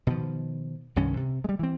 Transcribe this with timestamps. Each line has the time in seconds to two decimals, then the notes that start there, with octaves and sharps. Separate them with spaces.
0.07 B2 D#3 F3
0.96 C2 G2 D#3 C#4
1.17 C3
1.44 G3 G#3
1.59 E3 C4